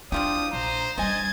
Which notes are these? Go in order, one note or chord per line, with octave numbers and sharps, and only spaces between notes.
F3 D4 E4 F4 G4 D#6
A#1 C5 A#5
G3 D4 C5 D#5 G#5 G#6 A6